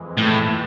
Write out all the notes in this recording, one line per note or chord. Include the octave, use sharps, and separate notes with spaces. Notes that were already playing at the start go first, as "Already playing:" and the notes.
Already playing: F2 E3 G#3
A2